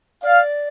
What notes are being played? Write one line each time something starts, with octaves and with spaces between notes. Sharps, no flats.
D5 F5